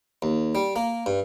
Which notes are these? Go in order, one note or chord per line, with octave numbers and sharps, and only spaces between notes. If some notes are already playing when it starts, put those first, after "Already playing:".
D#2
G3
A#3
G2